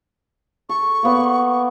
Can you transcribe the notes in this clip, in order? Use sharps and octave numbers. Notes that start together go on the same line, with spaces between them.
A4 C#6
A#3 B3 D5